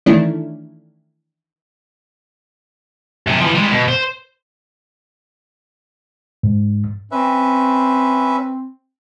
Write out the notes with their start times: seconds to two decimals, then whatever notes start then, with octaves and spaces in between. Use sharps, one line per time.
0.06 D#3 E3 A3 C#4 D4 E4
3.27 F#2 C3
3.40 E3 F3
3.54 G3 G#3
3.72 B2
3.88 C5
6.43 G#2
7.12 C4 C#4 B4 E5